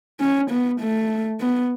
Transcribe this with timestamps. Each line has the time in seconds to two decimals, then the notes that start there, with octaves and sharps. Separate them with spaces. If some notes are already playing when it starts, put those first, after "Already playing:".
0.20 C#4
0.51 B3
0.80 A3
1.40 B3